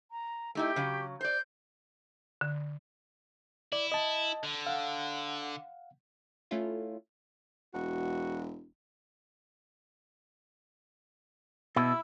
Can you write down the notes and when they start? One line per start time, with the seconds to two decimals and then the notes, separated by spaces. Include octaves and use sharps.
0.11 A#5
0.55 A3 D#4 E4 G4
0.76 C#3 F#3
1.21 C5 D5 G6
2.41 D3
3.73 E4 D5
3.92 D#5 A5
4.44 D3
4.67 F5 F#5
6.51 A3 C#4 E4 F4
7.74 E1 F#4
11.76 B2 E4 E6